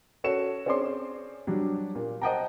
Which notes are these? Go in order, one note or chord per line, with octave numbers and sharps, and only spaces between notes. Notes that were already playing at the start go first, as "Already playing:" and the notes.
C#4 F#4 A4 C#5 C#7 E7
C4 C#4 G#4 C#5 D5 C6
F#3 G3 D4
A#2
C5 D#5 F#5 G5 A5 A#5